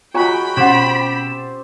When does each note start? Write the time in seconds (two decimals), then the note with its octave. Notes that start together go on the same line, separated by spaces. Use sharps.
0.14 G#3 F4 F#4 C#5 G5 G#5 A#5 B5
0.57 B2 C4 C#4 G4 C5 F#5 A6 E7